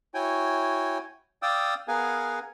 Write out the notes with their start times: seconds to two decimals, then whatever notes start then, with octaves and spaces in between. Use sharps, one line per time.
0.14 E4 F#4 C#5 G5 G#5
1.42 D5 F5 G5 D#6 E6
1.88 B3 G#4 A#4 F5 F#5 G#5